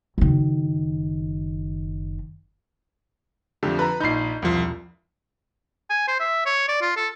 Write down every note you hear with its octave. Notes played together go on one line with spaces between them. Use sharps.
F#1 D#3
F2 D3 F3 A3 G4
B4 A#5
A#1 D#4 B5 G6 C7
E1 C2 F3 C7
G#5
C5
E5
C#5
D5
F4
A4